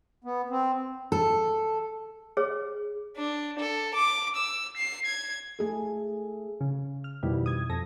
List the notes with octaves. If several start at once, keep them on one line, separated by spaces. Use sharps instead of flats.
B3
C4
A4
G#4 C#5
D4
A4
D6
E6
C7
G#6
A3 G#4 A4
C#3
F6
F2 B2 D#3 G3 E4
D#6 G#6
F2 A4 A#6